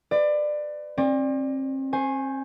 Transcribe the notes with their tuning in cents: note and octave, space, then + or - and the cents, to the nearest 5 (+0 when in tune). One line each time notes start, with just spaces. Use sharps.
B4 +35 D5 +25
C4 +40 D5 +10
C5 +0 G#5 +0 C#6 -35